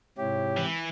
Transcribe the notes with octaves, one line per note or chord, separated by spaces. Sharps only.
G#2 C3 E4 G4 C#5
E3